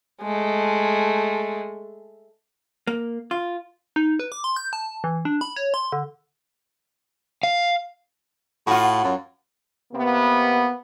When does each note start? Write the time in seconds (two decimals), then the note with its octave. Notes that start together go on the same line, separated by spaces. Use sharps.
0.21 G#3 A3
2.87 A#3
3.31 F4
3.96 D#4
4.20 B4
4.32 D6
4.44 C6
4.57 G6
4.73 A5
5.04 E3
5.25 D4
5.41 B5
5.56 C#5
5.74 C6
5.92 D3
7.43 F5
8.67 A2 F4 F#4
9.04 F#2
9.93 C3 A#3 B3